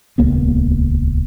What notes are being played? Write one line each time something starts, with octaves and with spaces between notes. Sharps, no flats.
D#1 C#2 A#3 B3